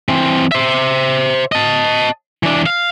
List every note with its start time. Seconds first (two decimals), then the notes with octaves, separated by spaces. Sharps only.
0.08 E3 C4
0.52 C5 E5
1.52 D#5 A5
2.43 E3 D4
2.66 F5